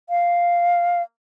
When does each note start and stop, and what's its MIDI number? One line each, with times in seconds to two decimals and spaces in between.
0.10 1.02 77